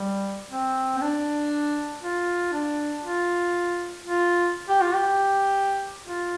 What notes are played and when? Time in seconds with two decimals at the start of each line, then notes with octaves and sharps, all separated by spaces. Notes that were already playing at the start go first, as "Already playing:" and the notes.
Already playing: G3
0.51 C4
0.98 C4
1.01 D4
2.03 F4
2.53 D4
3.04 F4
4.05 F4
4.69 G4
4.82 F4
4.95 G4
6.07 F4